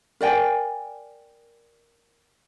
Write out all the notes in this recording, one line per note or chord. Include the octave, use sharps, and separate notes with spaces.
A#4 D5 G5 G#5